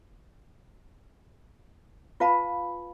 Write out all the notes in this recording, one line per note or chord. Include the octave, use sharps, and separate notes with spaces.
F4 B4 F5 A5 B5